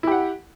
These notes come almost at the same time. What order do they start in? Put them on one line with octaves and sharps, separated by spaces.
E4 G4 F#5